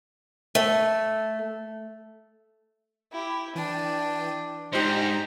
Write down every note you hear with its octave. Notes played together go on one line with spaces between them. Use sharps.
A3
E4 G4
E3 D4 G5 D#7
G#2 D#4 G4 C5 A#5